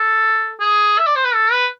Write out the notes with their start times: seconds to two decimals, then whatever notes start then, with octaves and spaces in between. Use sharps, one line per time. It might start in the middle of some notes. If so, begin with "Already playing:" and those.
Already playing: A4
0.60 G#4
0.98 E5
1.07 D5
1.16 C5
1.24 B4
1.34 A4
1.52 B4